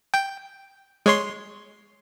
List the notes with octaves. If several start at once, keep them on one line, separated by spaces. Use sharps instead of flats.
G5
G#3 C#5 C6